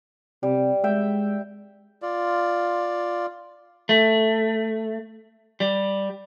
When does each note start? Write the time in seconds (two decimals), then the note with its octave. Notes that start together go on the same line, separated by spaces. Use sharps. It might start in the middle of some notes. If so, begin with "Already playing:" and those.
0.43 C3 G3
0.84 G#3 E5 G5
2.02 F4 D5
3.89 A3
5.60 G3